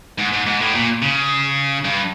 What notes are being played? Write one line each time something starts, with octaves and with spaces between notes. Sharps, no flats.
G#2
G#2
G#2
A2
A#2
C#3
G2